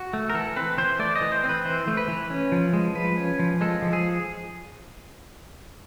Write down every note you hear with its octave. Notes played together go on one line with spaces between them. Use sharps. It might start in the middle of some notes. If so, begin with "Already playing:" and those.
Already playing: F#4
A3
A#4
E3 A4
C4 B4
E3 C5
A3 D5
D#5
E3
C5
C4
B4
E3 C5
A3
B4
E3
C#4
F3
G#3
F3 B4
C#4
F3
G#3 A4
F3
G#4